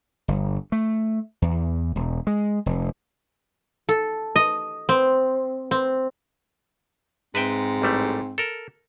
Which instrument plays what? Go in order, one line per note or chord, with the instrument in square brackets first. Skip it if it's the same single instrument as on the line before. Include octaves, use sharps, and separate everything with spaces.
[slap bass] G1
A3
E2
E1
G#3
F1
[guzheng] A4
D#5
C4
C4
[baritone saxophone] G#2 [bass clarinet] C4 [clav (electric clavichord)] B4 E5 G5
[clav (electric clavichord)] A1 G3 A3
A4 A#4